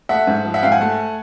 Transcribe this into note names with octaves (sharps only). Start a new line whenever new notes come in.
A3 E5 F#5
G#2
F3
E5 F#5
G#2 F5 G5
F#5 G#5
A3